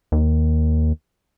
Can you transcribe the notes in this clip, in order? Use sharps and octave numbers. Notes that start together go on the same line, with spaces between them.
D#2